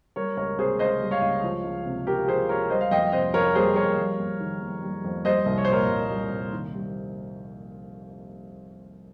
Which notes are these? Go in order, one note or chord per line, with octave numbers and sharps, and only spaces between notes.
G3 A#4 C#5
C#2 A#4 C#5
C3 G#4 C5
C#2 C5 D#5
G3
C#5 F5
C#2
F3
C#2
C3
C#2 G4 A#4
F3 G#4 C5
C#2 A#4 C#5
G3 C5 D#5
F5
F2 D#5 G5
C3 C5 D#5
F2 A#4 C#5
G3 G#4 C5
F2 A#4 C#5
G3
F2
D#3
F2
G3
F2
G3 C5 D#5
C2
C#5
C5
A#2 A#4 C#5
C2
G3
C2
D#3
G3